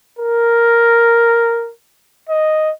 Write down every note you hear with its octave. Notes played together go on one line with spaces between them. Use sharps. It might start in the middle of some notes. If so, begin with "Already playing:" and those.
A#4
D#5